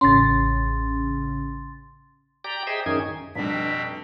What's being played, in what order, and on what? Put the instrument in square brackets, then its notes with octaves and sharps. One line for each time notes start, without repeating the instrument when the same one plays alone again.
[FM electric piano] A1 C#3 C#4 [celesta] C6 A6
[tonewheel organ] G4 D5 G5 A#5
G#4 C5 D#5 E5 G5
F#2 D#3 C#4 D#4 G#4 G#6
[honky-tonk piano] F1 G3 [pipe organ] B2 C4 [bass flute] D4 [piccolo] B6